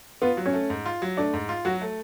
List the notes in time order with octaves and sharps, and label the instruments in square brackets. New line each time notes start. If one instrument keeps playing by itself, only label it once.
[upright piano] B3 [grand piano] F4
[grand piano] F#3
[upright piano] C#4
[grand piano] A3
G#2
F4
F#3
[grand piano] A3 [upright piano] D4
[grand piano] G#2
F4
[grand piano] F#3 [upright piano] F#4
[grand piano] A3